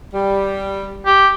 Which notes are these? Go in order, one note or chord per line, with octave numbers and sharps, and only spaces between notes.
G3
G4